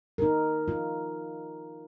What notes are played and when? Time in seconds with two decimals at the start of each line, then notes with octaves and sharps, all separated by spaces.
0.18 D#4 A#4
0.68 F4